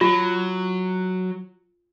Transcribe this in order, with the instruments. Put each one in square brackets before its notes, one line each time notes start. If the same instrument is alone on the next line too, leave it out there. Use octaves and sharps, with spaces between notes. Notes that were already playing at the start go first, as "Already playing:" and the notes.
[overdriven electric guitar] F#3 [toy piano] F4